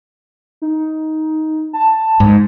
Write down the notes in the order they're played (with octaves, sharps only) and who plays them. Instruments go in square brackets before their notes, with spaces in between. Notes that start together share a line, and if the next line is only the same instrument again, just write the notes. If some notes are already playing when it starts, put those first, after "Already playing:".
[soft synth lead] D#4
A5
[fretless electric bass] G#2